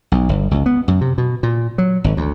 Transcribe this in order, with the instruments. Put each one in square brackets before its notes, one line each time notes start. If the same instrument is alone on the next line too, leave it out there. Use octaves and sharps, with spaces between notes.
[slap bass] B1
G1
C#2
B3
F#2
C3
B2
A#2
F#3
G#1
D2